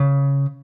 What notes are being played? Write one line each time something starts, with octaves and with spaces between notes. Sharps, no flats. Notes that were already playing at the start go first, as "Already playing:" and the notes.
Already playing: C#3